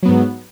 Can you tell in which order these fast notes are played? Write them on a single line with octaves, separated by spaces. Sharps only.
F#3 B3 G#2